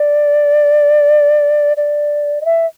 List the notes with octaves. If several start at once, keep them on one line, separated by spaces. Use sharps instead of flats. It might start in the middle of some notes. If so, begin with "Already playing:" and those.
Already playing: D5
D5
D#5
E5